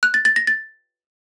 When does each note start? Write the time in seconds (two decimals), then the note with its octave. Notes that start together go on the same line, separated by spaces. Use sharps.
0.03 F#6
0.14 A6
0.25 A6
0.36 A#6
0.47 A6